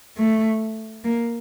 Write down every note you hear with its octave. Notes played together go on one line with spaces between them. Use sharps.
A3
A#3